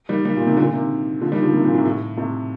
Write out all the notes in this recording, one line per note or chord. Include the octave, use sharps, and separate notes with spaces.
D#3 G3
D#3 G3
A#2
C3 D#3
A#2 D3
C3 D#3
D3 F3
D#3 G3
D3 F3
C3 D#3
A#2 D3
A2 C3
A2
A2 C3